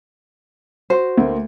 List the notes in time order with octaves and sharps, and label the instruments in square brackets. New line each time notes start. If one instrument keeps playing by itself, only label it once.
[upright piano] F#4 [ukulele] C5
[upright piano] D2 A#3